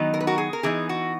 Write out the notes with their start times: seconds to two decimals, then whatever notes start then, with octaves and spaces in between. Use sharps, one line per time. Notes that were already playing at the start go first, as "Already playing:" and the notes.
Already playing: D#3 F#3 B3 D#4
0.14 A#4
0.20 B4
0.27 F#4 A#4
0.38 G#4
0.53 A#4
0.63 E3 B3 D#4 G#4
0.89 F#4